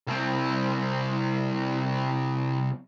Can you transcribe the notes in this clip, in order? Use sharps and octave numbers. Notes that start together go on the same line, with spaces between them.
C2 C4